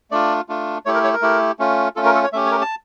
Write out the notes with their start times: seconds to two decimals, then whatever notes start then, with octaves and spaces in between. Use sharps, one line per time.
0.11 A3 D4 F4 D5
0.49 A3 D4 F4
0.86 A3 E4 G4 C#5
0.94 A#4
1.04 C#5
1.13 A#4
1.22 A3 E4 G4
1.59 A3 C#4 F4
1.96 A3 C#4 F4 A4
2.05 A#4
2.15 A4
2.24 C#5
2.33 A3 C#4 G4 E5
2.46 C#5
2.51 A#4
2.61 A5